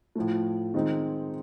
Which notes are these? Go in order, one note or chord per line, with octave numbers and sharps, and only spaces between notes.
A2 F3 A3
D#3 G#3 C4 D#4